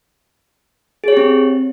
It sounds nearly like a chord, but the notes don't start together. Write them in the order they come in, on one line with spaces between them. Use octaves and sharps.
G#4 C#5 G4 C4